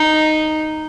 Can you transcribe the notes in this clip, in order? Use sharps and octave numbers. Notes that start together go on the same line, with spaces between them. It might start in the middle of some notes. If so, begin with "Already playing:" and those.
Already playing: D#4